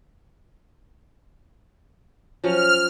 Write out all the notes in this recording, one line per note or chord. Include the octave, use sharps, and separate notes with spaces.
F3 F#3 C#4 F6